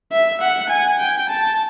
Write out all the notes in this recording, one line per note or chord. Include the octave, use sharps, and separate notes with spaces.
E5
F#5
G#5
G5
A5